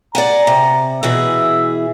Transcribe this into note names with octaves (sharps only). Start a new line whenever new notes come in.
D5 F#5 G#5 A#5
C3
B2 E3 G#4 E5